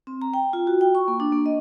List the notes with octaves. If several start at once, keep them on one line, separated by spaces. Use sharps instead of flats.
C4
A#5
G5
F4
F#4
G5
C#6
A#3
D4
A#3
D#5